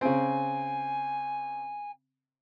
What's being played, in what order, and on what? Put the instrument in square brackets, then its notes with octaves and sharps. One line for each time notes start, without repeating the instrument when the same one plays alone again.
[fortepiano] C#3 C4 [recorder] G#5